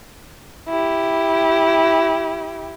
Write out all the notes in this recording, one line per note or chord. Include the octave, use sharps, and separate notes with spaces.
E4 G4